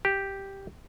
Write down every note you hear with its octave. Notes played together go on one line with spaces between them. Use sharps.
G4